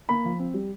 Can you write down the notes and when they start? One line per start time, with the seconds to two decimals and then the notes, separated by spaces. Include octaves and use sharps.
0.09 A#3 B5
0.25 F3
0.39 C4
0.54 G3